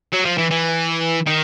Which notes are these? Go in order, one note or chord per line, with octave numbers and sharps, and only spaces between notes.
F#3
F3
E3
E3
D#3